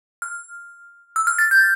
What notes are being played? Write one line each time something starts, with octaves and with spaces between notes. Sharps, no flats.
F6
E6
F6
A6
G6